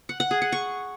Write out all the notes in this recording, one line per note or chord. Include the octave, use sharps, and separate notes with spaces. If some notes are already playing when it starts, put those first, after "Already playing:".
F#5
F#5
G#4
F#5
C#6